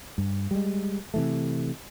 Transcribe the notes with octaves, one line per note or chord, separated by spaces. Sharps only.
G2
G3 G#3
C3 E3 A3